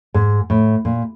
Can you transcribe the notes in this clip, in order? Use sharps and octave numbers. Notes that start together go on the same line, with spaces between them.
G#2
A2
A#2